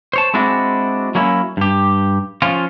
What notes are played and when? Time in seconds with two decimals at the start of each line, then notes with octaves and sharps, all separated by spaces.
0.13 C5 C#5 A5
0.34 G#3 C4 D4 E4 F#4
1.15 F#3 A#3 C#4 E4
1.57 G2 G4
2.42 F3 C#4 F4